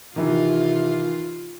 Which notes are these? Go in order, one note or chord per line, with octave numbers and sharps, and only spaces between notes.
C3 D#3 E3 F4